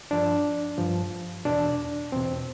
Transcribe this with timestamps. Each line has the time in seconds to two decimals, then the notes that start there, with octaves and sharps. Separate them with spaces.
0.11 G2 F3 D4
0.78 G2 F3
1.45 E2 B2 D4
2.12 E2 B2 C4